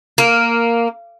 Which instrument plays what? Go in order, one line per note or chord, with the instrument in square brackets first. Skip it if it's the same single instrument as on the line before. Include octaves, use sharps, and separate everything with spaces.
[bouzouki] A#3